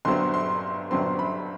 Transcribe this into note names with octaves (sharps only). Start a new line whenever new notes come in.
G1 G2 F#3 C4 C6
C6
G1 G2 F#3 C4 C6
B5